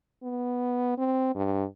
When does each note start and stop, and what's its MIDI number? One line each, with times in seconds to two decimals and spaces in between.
0.23 0.97 59
0.98 1.34 60
1.35 1.64 43